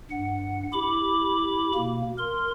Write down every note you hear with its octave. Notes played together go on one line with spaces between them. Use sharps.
G2 F#5
E4 G4 B5 D6
B2 A#3
A#4 C6